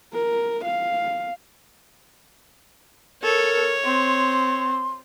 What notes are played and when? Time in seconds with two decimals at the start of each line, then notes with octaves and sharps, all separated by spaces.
0.13 A#4
0.65 F5
3.23 A4 A#4 C#5
3.85 C4 C6